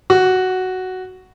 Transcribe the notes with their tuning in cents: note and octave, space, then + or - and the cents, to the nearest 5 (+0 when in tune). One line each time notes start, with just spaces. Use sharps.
F#4 +5